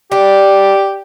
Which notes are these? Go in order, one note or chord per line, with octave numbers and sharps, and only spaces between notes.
D4 G4